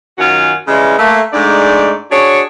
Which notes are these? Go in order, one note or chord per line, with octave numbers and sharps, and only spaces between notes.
F#2 D#3 F4 F#4 F#5 G#5
C#3 E3 G3 G#3
A3 A#3
G#2 G#3 A3 D4 D#4 D5
D4 F#4 G#4 C#5